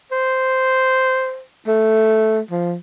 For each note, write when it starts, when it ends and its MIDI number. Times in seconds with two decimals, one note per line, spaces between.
0.11 1.42 72
1.67 2.40 57
2.51 2.75 53